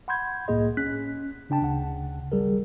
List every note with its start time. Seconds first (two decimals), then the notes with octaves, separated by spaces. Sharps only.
0.08 F#5 B5 C6 G6 G#6
0.48 C2 A2 A#3 G#4 D#5
0.77 C#4 F#6 B6
1.50 C#3 D4 G5 A5
1.61 D2 C#3 F#5
2.32 G#1 G3 G#4 A#4